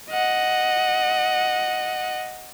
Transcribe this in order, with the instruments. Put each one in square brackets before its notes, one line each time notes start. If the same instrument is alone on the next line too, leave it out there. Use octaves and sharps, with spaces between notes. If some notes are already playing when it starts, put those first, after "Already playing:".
[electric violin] D#5 F#5